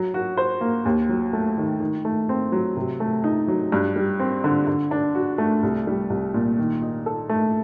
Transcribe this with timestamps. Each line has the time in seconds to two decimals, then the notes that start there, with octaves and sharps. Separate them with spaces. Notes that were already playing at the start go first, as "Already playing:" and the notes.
Already playing: F#3
0.14 F#4
0.37 C5
0.61 A#3
0.85 D#2
1.09 F#3
1.33 A3
1.57 D#3
1.80 D#3
2.05 A3
2.29 C4
2.52 F#3
2.76 C3
3.00 A3
3.24 D#4
3.48 F#3
3.72 G2
3.96 G3
4.20 C4
4.44 D3
4.67 D3
4.91 D4
5.15 F#4
5.38 A3
5.63 C2
5.87 G3
6.10 C2
6.34 A#2
6.59 D#3
6.82 D#4
7.06 A4
7.29 A3